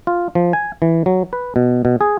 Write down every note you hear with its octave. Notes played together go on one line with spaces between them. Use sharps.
F4
F3
G#5
E3
F#3
B4
B2
B2
G#4